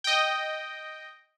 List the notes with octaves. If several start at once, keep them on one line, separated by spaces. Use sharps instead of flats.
D#5 G5